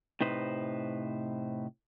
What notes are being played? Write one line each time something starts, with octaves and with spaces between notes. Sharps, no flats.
A2 C3 D#4 B4 C5